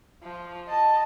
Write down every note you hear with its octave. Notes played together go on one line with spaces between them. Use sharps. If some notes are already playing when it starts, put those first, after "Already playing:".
F3
D#5 A5